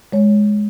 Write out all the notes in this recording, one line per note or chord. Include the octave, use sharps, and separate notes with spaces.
G#3 C#5